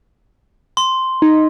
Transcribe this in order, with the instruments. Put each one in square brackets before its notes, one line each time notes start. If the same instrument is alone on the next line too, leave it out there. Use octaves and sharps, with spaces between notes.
[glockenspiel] C6
[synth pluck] D#4